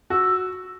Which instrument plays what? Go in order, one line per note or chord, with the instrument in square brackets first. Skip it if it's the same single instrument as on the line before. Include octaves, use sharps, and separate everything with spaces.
[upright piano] F#4 [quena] E6